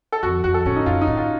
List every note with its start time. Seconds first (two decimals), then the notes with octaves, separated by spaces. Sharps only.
0.12 A4
0.23 F2 F#4
0.44 F2 F#4
0.54 A4
0.66 A2 C#4
0.76 D#4
0.86 F#2 F4
1.01 D#4
1.07 A2
1.17 F4